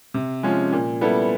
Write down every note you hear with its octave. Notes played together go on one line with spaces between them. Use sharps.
C3
F3 G#3 C#4
A#2
G3 B3 E4 A4